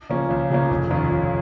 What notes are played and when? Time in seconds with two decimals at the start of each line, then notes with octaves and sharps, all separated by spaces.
0.09 C#3 F3 A#3 C#4
0.30 C#2
0.50 C#3 F3 A#3 C#4
0.71 F1
0.91 D#2 D#3 C#4 F4
1.11 F1